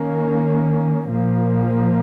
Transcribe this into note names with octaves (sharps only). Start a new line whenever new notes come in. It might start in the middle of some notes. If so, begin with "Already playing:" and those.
Already playing: D#3 A#3 C#4
A#2 F3 A#3